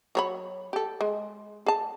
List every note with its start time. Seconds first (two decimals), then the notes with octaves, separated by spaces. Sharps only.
0.15 F#3 C#5 B5
0.73 G4 A4
1.01 G#3
1.66 G#4 A5